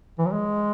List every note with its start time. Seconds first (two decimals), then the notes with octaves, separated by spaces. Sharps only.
0.18 E3
0.25 F#3
0.32 G#3